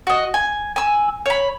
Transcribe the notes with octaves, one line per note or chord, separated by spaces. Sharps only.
F#4 D#5
G#5
G#5 E6
C#5 B5